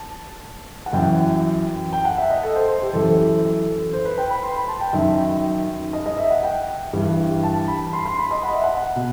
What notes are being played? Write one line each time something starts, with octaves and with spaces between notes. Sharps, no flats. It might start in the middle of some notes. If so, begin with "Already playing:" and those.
Already playing: A5
F#5
F#2 E3 G5
G5
F#5
E5
D#5
A4
C5
C5
G4
F#2 E3 A4
C5
B4
G5
B5
C6
A5
G5
F#2 D#3 E5
D#5
D#5
E5
F#5
G5
G2 E3
A5
B5
C6
C6
B5
D#5
F#5
E5
F#5
B2